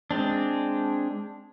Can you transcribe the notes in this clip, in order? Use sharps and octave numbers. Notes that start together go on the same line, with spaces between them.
G#3 C4 D4